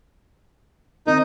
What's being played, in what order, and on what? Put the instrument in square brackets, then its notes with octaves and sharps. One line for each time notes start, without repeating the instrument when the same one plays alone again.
[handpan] D#3 C4 A#4 [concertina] D#4